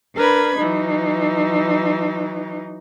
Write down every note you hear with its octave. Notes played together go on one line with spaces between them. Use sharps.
D4 A#4 B4 B5 G#6
E3 F#3 D#4